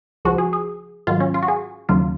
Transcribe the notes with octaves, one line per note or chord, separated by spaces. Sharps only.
C#2 C#3 F3 F#4
G#4
G#4
G#2 D#3 F#3 F4
C#4
F4
F#4
G#4
D#2 C#3 F#3 F4